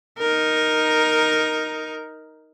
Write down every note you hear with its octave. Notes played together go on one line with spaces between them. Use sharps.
D#4 A#4